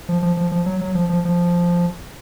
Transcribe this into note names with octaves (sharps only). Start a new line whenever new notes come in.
F3
F3
F3
F3
F#3
F#3
F3
F3
F3